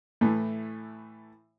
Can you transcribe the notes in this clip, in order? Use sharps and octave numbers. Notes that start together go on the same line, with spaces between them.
A2 E3 A3